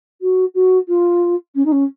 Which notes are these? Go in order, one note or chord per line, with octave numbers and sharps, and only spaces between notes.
F#4
F#4
F4
C#4
D#4
C#4